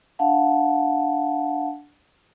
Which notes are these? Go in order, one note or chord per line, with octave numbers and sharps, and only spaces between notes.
D4 F5 F#5 A5